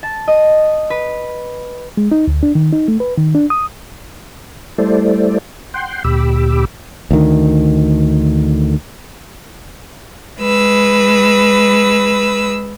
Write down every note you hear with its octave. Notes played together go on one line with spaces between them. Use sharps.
A5
D#5
B4
G#3
D#4
D2
D4
D#3
D#4
A3
B4
D#3
D4
D#6
G3 A3 E4 A4 C5 D5
F#5 G5 C6
D2 A#2 G4 B5 D6 E6
D2 D#3
G#3 B4 E6